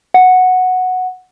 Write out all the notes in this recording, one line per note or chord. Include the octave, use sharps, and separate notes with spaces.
F#5